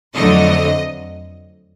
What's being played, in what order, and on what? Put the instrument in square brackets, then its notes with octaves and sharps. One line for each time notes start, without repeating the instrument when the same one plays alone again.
[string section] F2 D3 F#3 A3 D#5